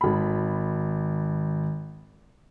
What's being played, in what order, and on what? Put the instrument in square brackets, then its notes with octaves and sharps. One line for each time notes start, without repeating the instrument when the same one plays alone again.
[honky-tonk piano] G#1 B5